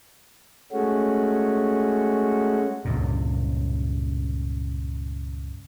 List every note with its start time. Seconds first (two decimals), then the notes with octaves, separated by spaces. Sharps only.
0.72 G#3 A3 C#4 F#4
2.85 C#2 G2 A#2